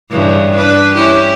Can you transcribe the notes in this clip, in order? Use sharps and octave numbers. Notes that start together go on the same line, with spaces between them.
G2 C#3 E3
D4 B4
C#4 E4 G4